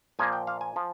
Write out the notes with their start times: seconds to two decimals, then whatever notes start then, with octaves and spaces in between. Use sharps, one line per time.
0.19 A#2 F3 A#3 G#5
0.33 G5
0.47 F5
0.61 G#5
0.76 F3